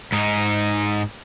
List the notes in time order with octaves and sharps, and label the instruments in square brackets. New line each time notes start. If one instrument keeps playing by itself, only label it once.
[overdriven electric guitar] G#2 D#4